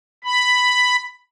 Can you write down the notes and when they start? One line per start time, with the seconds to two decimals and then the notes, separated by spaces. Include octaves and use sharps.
0.24 B5